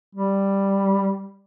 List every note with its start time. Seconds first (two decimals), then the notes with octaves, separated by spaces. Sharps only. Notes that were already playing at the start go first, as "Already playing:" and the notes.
0.15 G3